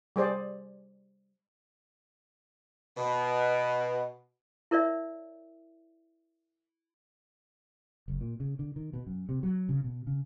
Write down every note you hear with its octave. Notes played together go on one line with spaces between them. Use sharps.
G3 G#4 C5 D5
B2
E4 A#4 C#5 D5 E5
F#1
A#2
C#3
D3
D#3
B2
F#2
C3
F#3
C#3
B2
C#3